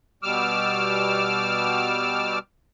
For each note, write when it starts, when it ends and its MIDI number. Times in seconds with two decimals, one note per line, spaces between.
0.23 2.39 47
0.23 2.39 55
0.23 2.39 86
0.23 2.39 88
0.23 2.39 89